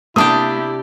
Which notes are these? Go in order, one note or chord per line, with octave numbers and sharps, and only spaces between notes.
C3 A#3 D4 E4 G4 A5 D#6